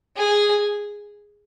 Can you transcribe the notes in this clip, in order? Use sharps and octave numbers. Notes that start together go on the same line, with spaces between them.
G#4